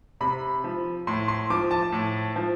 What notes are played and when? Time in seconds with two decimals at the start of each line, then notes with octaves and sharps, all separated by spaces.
0.21 C3 B5
0.64 F3
1.07 A2 C6
1.28 C6
1.50 F3 D6
1.71 A5
1.92 A2
2.36 F3